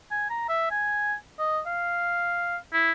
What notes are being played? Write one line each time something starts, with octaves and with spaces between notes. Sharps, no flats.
G#5
A#5
E5
G#5
D#5
F5
E4